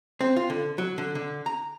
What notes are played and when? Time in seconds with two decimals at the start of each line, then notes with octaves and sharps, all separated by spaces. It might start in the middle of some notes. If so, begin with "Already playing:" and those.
0.21 C4
0.36 F4
0.50 D3
0.78 F#3
0.98 D3
1.15 D3
1.46 A#5